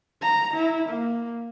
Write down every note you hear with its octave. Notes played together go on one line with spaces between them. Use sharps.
A#5
E4
A#3